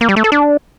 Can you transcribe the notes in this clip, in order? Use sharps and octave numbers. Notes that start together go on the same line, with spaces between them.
A#3
G3
A3
A4
D4